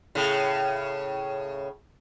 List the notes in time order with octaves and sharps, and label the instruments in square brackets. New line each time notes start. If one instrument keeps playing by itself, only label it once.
[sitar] A2 C#3